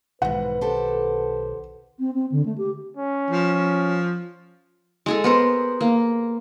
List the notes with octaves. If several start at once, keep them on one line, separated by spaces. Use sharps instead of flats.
B1 G#2 D#3 E3 B4 F#5
G4 A4 C5
C4
C4
D3
A3
G4
C#4
F3
G#3 G#4 A4
B3 A#4 C5
A#3